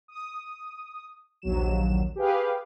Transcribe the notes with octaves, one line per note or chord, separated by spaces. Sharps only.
D#6
A#1 D#2 F#3 E7
G4 G#4 B4 F5